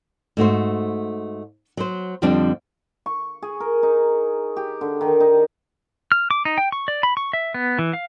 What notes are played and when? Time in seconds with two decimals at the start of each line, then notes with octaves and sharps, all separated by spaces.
0.37 G#2 A3 F#4 C5
1.77 F#3 C5
2.22 F2 D3 F3 G3 C4 D4
3.06 C#6
3.42 G#4
3.60 A#4
3.83 D#4
4.57 G4
4.81 D3
5.01 D#3
5.20 D#4
6.12 F6
6.31 D6
6.45 D#4
6.58 G5
6.72 C#6
6.88 D5
7.03 B5
7.17 C#6
7.33 E5
7.54 B3
7.79 E3
7.93 F5